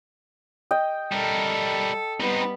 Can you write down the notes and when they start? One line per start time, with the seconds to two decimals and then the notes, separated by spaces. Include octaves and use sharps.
0.71 D#5 G5
1.12 G3 A4 A#4
2.20 G3 B3 C4 D#4 B4